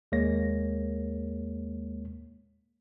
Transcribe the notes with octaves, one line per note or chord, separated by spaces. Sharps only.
D#2 G#3 A#3 C#5 A#6